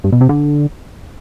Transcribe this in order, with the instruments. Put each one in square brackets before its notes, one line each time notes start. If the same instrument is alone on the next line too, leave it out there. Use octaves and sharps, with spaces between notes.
[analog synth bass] G2
B2
C3
D3